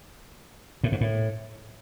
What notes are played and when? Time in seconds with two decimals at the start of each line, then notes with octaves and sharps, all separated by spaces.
0.84 A2
0.92 G#2
1.01 A2